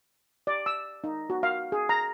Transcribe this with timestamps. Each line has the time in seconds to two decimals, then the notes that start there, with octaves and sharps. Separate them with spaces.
0.47 D5
0.66 E6
1.04 D#4
1.30 F#4
1.43 F5
1.72 G#4
1.89 A#5